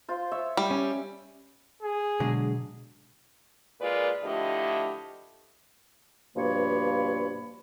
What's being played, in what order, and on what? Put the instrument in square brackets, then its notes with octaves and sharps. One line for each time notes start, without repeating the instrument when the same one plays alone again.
[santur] F4 C5
C#5 E5
[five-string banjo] G3
[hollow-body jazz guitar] C#4
[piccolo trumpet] G#4
[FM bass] B2 [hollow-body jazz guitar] D3 F#3 G#3
[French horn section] A#2 G#3 F4 A#4 B4 D5
D3 F3 A3 E4 G4 D#5
[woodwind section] G2 B2 F3 A#3 C#5 B5